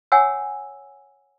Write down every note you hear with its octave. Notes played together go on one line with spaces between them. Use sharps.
C#5 F#5 G#5 E6